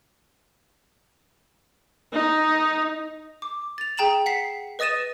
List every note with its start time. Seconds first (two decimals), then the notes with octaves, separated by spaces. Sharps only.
2.13 D#4
3.42 D6
3.78 A6 F7
3.97 G#4 G5 A#5 E7 F#7
4.26 F#5 B6 C7
4.79 B4 D#5 D#6 A6 D#7 E7